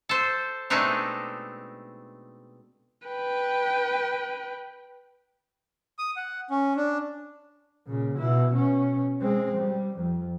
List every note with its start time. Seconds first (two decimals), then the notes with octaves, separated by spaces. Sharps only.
0.09 A4 C5
0.70 B2 G#3 A3 C4 D4 D#4
3.07 B4 G5
5.99 D#6
6.16 F#5
6.50 C#4
6.76 D4
7.87 A#2 C#3
8.17 B2 E4
8.51 B2 C#4
9.21 G#3 C4
9.57 G3
9.96 F2